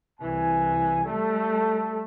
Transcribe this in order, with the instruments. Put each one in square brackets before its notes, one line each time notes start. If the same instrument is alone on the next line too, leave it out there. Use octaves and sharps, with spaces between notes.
[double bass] C2 E3 [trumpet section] G#5
[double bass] G3 A3 [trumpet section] A4